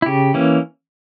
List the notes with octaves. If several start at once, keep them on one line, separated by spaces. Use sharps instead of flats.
E4
C#3 G4
E3 A#3 C#4